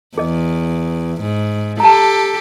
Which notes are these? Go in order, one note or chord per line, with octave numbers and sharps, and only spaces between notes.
E2 G#4 D#5
G#2
G4 A4 A5 A#5